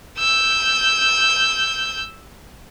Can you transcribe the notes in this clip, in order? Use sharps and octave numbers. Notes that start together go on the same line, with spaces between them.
E6 G6